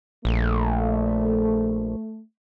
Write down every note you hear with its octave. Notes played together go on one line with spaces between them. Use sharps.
A#1 A3